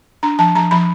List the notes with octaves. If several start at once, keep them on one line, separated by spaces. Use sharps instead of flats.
D4 A#5
F3 A5
F3 A#5
F3 B5